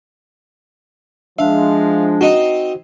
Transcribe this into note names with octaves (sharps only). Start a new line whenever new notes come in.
F3 G#3 D4 E5 F5
C4 D#4 F#4